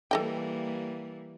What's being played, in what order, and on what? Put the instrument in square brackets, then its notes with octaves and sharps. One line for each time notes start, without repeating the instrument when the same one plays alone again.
[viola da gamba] E3 G3 A#3 [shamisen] A4 D#5 G5